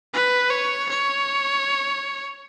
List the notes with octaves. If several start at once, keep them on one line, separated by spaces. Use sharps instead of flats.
B4
C#5
C#5